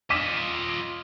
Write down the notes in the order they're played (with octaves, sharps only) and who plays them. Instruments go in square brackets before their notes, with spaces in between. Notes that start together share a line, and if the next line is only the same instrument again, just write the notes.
[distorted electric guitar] F4 D#5 [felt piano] D6 B6 E7